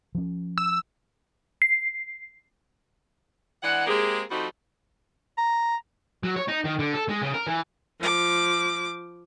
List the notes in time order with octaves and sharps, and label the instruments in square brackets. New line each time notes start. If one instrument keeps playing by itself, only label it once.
[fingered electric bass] F3 C#4
[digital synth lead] E6
[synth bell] C7
[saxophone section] E3 G#3 D4 F#5
G#3 A#3 C4 G4 G#4
F3 G3 A3 C4 D#4 F#4
[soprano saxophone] A#5
[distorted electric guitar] F#3
C#5
D#4
D#3
D3
A4
G#3
C#3
A#4
E3
[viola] F3 D6